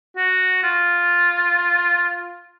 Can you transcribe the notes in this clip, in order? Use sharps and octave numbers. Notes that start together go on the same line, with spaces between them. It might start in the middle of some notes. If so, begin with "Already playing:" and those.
F#4
F4